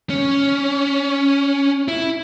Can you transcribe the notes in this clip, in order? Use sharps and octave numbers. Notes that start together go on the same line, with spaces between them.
C#4
E4